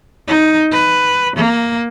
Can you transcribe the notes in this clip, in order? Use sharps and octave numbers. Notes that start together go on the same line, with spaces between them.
D#4
B4
A#3